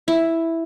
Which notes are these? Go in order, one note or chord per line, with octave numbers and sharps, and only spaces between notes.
E4